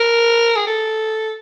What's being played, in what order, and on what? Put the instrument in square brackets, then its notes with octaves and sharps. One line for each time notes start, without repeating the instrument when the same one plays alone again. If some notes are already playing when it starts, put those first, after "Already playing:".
Already playing: [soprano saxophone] A#4
G#4
A4